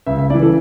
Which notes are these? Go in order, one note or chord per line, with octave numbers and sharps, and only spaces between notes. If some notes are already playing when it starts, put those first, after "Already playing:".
C#2 E5
E5
C#3 E3 D5
A4